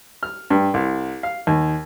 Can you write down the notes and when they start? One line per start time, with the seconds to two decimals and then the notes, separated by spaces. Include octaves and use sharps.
0.23 F6
0.50 G2
0.74 C2
1.23 F5
1.47 D#2